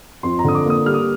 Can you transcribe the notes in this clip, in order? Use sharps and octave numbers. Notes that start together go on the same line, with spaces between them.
F2 C6
A#5
D3 D#6
D6
A#3 D#6
G3 F6
D#6